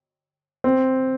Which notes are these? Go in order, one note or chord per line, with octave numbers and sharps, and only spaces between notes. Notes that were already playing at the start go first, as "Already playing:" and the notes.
C4